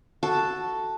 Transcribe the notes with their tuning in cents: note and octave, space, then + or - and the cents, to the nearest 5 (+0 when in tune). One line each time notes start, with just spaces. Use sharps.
F#4 +0 A4 +0 A5 +0